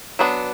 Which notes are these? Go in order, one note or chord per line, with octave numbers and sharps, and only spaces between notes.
F#3 B3 D4